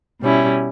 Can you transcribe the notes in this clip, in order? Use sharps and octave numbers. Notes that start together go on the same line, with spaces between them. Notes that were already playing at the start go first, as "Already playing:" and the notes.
B2 G3 C#4 E4